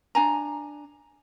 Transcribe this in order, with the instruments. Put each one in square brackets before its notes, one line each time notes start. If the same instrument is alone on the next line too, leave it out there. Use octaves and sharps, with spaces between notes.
[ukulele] D4 G#5 A#5